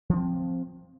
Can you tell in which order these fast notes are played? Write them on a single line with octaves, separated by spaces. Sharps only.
F3 D4 C4